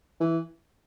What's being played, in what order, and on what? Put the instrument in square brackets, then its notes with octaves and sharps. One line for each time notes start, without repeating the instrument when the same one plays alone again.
[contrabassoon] E3